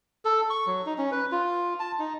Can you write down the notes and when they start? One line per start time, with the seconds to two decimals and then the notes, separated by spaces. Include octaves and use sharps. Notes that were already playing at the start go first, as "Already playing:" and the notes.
0.25 A4
0.50 C#6
0.67 F#3
0.86 D#4
0.98 C#4
1.12 B4
1.32 F4
1.79 A5
1.99 D#4